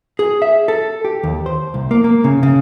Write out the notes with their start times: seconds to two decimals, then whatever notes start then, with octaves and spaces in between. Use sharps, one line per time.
0.19 G#4
0.42 E5
0.68 A4
1.05 G4
1.23 D#2
1.46 C5
1.74 C2
1.91 A#3
2.04 A#3
2.24 C#3
2.43 C#3